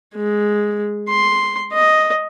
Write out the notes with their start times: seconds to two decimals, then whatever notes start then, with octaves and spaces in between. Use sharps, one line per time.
0.15 G#3
1.09 C6
1.72 D#5